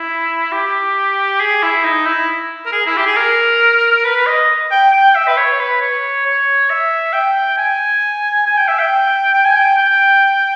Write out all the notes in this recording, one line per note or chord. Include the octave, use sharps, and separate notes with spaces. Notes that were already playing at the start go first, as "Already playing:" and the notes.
Already playing: E4
G4
G#4
E4
D#4
E4
A#4
G#4
E4
G4
G#4
A#4
B4
D#5
G5
G5
E5
B4
C#5
C#5
B4
C#5
C#5
E5
G5
G#5
G#5
G5
E5
G5
G5
G#5
G5
G5